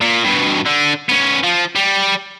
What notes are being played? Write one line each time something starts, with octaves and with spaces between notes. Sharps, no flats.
A#2
G2 B2
D3
B3 C#4
F3
G3